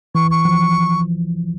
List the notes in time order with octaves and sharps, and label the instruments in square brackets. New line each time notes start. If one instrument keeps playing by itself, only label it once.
[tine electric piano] E3 [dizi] C#6
[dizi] C#6
[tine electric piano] F3